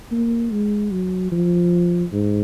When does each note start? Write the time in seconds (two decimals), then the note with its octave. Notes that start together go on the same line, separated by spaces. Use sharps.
0.11 A#3
0.51 G#3
0.91 F#3
1.32 F3
2.12 G#2